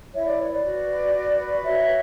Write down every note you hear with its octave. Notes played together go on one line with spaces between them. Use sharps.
E4 C#5 E5
D5
B4 C#5
D5
F#4
B4
F#4
B4
F#4 C#5 E5